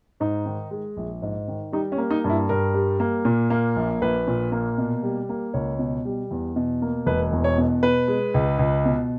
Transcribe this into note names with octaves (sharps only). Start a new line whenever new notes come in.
G#2 D#4
D#3
G#3
A#1
G#2
D#3
G3 D#4
C#4
A#3
D#4
G2
E4
G2 A#4
G3
A#3
A#2
A#3
A#1
A#1 B4
A#2
A#3
B2
G3
A#3
C#2 C#5
B2
G3
E2
B2
A#3
E1 B4
E2
C#5
B2
B2 B4
G#3
C#2
C#2
B2